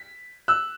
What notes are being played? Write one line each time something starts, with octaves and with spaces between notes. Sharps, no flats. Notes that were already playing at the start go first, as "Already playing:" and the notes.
Already playing: B6
E6 F#6